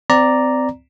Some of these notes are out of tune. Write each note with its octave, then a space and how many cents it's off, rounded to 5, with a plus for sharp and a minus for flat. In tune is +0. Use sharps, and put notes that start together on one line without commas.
C4 -30 D5 +0 A#5 +0